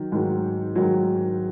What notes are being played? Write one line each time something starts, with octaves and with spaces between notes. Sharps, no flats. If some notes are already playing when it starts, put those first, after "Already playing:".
Already playing: D#3 F#3
G#2 D#3 F#3
G#2 D#3 F#3